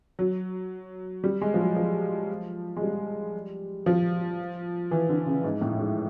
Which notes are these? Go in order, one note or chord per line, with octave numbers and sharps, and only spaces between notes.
F#3
G3
G#3
F3
F#3
F3
G#3
G3
F3
E3
D3
C#3
G#2
A2
G#2